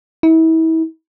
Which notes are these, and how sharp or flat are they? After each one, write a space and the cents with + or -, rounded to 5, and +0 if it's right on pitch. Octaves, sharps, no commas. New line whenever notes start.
E4 -35